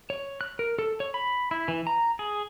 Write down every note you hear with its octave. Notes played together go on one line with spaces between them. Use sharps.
C#5
F#6
A#4
A4
C#5
B5
E4
E3
A#5
G#4